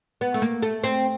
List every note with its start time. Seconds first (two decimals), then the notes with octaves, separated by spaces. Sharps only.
0.21 B3
0.34 A3
0.42 A#3
0.62 A3
0.84 C4